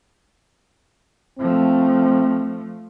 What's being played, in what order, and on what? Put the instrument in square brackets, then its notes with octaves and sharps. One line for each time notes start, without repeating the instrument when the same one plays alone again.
[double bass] F3 A3 [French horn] C4